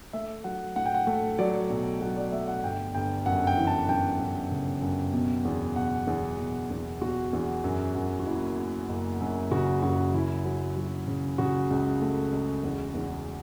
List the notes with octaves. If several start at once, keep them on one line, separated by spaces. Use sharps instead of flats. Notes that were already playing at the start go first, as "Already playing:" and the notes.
A3 E5
F#3 F#5
A2 F#5
G5
F#5
A3
F#3 D5
B1
F#3 F#5
D5
A3 E5
F#5
G1 G5
G1 G5
F#2 F#5
G5
E3
A5
F#2 G5
F#2
C#3
F#2
B2
E2
B2 F#5
E2
B2
E2
B2 F#4
E2
F#2
F#2
F#4
F#1 E4
F#1
F#1
F#2
C#3 F#4
F#2 F#4
C#3 E4
F#3
F#3
C#3
C#3 F#4
C#2
A3
C#2
E2
E2